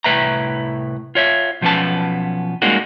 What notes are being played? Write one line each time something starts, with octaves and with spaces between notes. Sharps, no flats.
C2 A2 A3 B4 E5 A#5
F4 C#5 E5
B1 F3 B3 C#4 B4 A5
G3 G#3 A#3 C#4 D#4 F#4